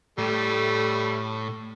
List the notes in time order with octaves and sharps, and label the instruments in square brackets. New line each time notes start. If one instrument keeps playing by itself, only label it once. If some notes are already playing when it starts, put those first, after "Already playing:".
[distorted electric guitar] A2 [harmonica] G3 A3